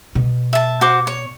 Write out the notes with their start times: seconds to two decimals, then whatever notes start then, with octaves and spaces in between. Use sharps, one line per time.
0.15 B2
0.53 E5 A5
0.81 F#4 C5 D6
1.07 C#5